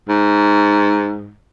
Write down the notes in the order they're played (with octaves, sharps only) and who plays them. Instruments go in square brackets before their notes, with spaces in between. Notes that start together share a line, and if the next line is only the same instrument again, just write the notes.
[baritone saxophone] G#2